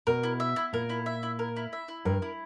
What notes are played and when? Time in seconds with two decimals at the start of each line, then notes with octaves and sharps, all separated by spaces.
0.07 B2 A#4
0.23 E4
0.40 E5
0.56 E4
0.73 A#2 A#4
0.90 E4
1.06 E5
1.23 E4
1.39 A#4
1.56 E4
1.73 E5
1.88 E4
2.05 G2 A#4
2.22 E4